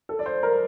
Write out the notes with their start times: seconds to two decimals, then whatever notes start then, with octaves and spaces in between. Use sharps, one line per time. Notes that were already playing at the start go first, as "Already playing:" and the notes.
0.09 A4
0.19 D5
0.26 C5
0.43 A#4